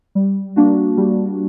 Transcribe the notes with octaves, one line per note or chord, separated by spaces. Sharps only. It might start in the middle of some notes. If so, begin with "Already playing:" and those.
G3
A#3 D4 F#4
G3